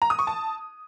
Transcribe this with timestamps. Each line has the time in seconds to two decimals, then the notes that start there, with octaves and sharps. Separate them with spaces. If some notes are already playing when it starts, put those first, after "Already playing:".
0.02 A#5
0.10 D#6
0.19 C#6
0.27 A5